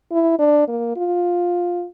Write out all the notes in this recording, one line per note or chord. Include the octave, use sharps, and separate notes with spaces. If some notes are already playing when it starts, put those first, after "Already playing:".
E4
D4
A#3
F4